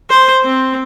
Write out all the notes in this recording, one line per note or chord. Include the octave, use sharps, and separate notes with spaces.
C5
C4